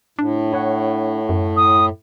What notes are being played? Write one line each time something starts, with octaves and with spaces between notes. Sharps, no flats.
A2 D4
E4 C#5 F#5
F#2
D#6